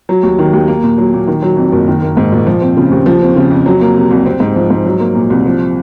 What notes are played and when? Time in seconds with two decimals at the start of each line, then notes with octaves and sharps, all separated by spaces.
0.09 F#3
0.23 D#2
0.39 D#3
0.53 D#2
0.68 A#3
0.83 A#2
0.98 F#3
1.13 A#2
1.28 D#3
1.42 F#3
1.57 F2
1.72 F#1
1.88 D#3
2.02 A#3
2.17 G#2
2.32 A#1
2.47 F3
2.61 C4
2.77 C#3
2.91 D#2
3.06 F3
3.22 C4
3.36 C#3
3.51 F2
3.66 F#3
3.81 A#3
3.96 C3
4.11 C2
4.26 C4
4.40 G#2
4.56 F3
4.70 G#2
4.86 F#3
5.00 A#3
5.15 A#2
5.30 C2
5.46 F3